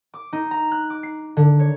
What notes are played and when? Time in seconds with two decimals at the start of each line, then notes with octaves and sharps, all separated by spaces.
0.14 D6
0.33 D#4
0.51 A#5
0.72 F#6
0.90 D6
1.03 C7
1.37 D3
1.59 C#5